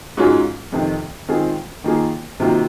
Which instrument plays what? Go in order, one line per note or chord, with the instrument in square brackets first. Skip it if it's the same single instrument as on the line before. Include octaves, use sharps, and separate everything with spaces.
[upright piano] G#2 F#3 C#4 F4 G#4
F2 C3 D#3
D#3 G#3 C4 F4 G#4
D#3 A#3 F4 G#4
C3 D#3 F#3 A#3 F4